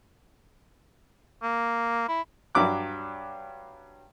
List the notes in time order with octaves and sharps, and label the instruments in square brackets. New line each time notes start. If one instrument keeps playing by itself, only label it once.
[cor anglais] A#3
E4
[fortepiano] G2 F#3 D6 F#6